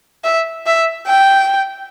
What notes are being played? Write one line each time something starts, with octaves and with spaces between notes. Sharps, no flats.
E5
E5
G5